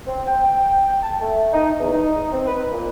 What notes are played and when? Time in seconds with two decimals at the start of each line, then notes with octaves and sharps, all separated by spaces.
0.06 C4
0.26 G5
1.02 A5
1.20 A3
1.52 D#4
1.80 E2
1.93 D#4
2.32 C4
2.47 B4
2.71 A#2